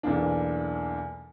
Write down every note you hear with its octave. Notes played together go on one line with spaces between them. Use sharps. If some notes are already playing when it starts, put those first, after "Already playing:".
B1 E2 E3 A#3 D4